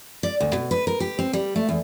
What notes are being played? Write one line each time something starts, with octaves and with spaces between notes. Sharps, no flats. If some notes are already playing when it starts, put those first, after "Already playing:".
D5
D2
B2
B4
A#4
G4
C4
G3
A3
E2